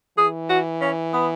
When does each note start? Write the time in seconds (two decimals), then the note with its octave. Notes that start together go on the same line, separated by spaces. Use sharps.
0.18 E3 G#4
0.49 F#4
0.81 C#4
1.13 B3